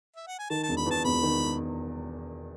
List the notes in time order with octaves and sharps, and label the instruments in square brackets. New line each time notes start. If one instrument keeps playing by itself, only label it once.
[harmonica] E5
F#5
G#5
[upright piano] D#3 [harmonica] A5
[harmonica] A5
[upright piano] E1
[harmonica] B5
[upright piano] E2 [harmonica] A5
[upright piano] E1 [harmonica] B5
[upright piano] D#3